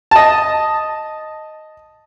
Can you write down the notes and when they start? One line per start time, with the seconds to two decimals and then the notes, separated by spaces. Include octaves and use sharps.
0.11 D#5 A5